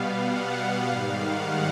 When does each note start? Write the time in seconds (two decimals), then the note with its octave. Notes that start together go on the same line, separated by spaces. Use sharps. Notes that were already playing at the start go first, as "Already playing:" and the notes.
Already playing: B2 G3 B3 F5
0.14 F#5
0.87 G#2 D#3 G3 F5
1.23 F#5